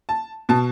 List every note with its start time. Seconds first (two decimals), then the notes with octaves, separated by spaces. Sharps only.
0.09 A5
0.49 B2 A5